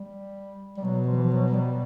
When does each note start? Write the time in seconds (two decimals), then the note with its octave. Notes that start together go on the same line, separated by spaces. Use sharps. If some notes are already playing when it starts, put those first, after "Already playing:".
Already playing: G3
0.77 G3
0.84 B2 F#3
1.07 F3
1.16 E3
1.24 F3
1.31 F#3
1.48 F#3
1.54 G3